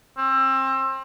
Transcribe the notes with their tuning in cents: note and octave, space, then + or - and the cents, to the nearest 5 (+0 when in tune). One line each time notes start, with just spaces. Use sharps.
C4 +30